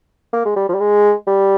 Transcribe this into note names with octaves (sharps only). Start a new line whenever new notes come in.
A#3
G#3
G3
F3
G3
G#3
G3